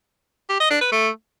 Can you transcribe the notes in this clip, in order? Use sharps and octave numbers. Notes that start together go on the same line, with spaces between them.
G4
D#5
D4
B4
A3